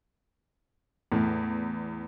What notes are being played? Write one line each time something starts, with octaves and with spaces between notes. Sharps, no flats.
E2 A2